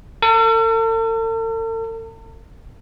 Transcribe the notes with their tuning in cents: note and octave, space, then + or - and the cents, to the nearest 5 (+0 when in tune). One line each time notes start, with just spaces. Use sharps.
A4 +45